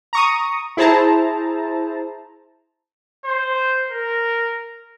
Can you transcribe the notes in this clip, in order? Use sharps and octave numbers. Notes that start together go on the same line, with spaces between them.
A#5 C#6 D#6
E4 G#4 C5 A5 A#5
C5
A#4